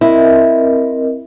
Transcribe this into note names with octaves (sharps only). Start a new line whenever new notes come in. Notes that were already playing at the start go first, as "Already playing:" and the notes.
C4 E4 A#4 D#5